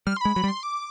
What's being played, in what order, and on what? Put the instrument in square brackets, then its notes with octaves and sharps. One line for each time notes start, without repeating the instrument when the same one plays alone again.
[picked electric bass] G3 [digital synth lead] F6
[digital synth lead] C6
[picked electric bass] G#3 [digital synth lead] B5
[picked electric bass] F#3 [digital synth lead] B5
[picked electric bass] G3
[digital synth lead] C6
D6